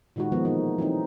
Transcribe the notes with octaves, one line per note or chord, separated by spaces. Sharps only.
A#2 D#3 G#3 D#4 F#4
D#3 F3 G#3 A3 B3
B2 E3 A#3 D#4 F#4
E3 F#3 A3 C4 D#4